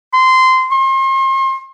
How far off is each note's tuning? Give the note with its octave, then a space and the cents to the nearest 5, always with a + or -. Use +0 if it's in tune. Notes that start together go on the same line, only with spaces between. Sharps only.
C6 -15
C6 +40